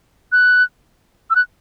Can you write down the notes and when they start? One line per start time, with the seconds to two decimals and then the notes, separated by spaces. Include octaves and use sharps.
0.32 F#6
1.30 E6
1.36 F#6